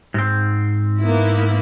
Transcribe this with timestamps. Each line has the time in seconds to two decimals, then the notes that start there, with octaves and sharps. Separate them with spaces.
0.14 G#2 C4
1.00 A#3 B3 E4